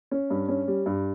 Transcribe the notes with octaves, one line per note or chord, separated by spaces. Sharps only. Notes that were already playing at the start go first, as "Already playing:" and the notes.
C#4
G2
C#4
G3
G2